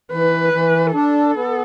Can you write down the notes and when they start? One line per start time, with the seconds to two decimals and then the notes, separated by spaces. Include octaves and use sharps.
0.12 E3 B4
0.53 E3
0.93 D4 A4
1.35 B3